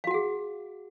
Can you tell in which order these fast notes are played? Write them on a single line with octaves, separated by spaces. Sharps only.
F5 F#4 F#5 G#4